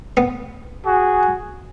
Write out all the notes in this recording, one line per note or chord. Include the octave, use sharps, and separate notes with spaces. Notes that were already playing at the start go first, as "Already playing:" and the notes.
B3
F#4 G#4